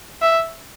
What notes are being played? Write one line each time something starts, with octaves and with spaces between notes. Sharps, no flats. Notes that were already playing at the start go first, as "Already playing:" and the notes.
E5